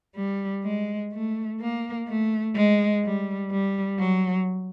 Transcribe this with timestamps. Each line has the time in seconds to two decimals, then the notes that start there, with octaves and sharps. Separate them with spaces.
0.16 G3
0.64 G#3
1.12 A3
1.60 A#3
2.07 A3
2.55 G#3
3.03 G3
3.51 G3
3.98 F#3